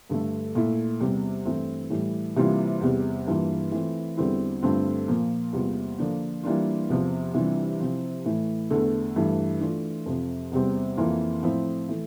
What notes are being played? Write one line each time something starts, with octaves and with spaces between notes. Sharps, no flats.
G2 D3 A3
A#2 A3 E4
E2 C3 G3
G2 E3 A3 C4 E4
A2 E3 G3
C3 E3 G3 A#3 F4
E2 C3 G3
G2 E3 A#3 F4
E3 A3 C4 F4
E2 D3 G3 C4 E4
G2 D3 A3 C4 F4
A#2 F3 A#3
E2 C3 G3 A#3 F4
D3 F3 A#3 D4
E3 G3 A#3 D4 F4
E2 C3 F3
C3 E3 G3 D4 F4
C3 F3 C4 E4
A2 E3 A3
E2 D3 A3
G2 E3 A3
E3 A3 D4 F4
F2 C3 F3
E2 C3 G3 C4
F2 E3 A#3 F4
A2 F3 C4 E4
E3 A3